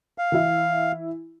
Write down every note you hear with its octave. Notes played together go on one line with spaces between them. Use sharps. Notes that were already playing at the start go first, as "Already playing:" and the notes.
F5
E3 E4